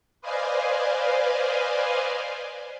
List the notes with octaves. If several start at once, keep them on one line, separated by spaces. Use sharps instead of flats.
B4 C5 D5 D#5 F5 G#5